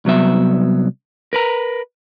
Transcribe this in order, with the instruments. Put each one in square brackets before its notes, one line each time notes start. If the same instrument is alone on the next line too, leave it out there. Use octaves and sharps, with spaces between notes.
[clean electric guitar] C2 F#3 B3 E5
A#4 B4 A#5